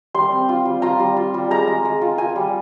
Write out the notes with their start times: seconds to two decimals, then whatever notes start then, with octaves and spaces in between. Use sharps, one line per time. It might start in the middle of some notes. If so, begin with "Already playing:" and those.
0.14 G3 C6
0.32 C4
0.49 F4
0.65 G3
0.82 F4 A#5
1.00 G3
1.17 F4
1.34 G3
1.51 G#3 A#5
1.67 G#3
1.85 G#3
2.01 F4
2.18 F4 G#5
2.36 G3